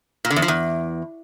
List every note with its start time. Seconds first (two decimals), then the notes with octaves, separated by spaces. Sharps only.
0.25 A#2
0.30 D3
0.36 E2
0.42 F3
0.48 E2